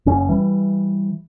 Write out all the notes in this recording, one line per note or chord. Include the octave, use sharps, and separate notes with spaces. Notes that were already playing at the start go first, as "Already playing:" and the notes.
F#1 C#4
E3 G3